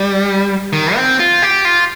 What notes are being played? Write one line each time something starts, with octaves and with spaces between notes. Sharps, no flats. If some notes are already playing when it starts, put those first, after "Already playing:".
Already playing: G3
D#3
C4
F4
G4
F4